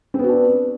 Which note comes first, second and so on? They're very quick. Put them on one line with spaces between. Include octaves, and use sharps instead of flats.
C4 B3 F#4 D4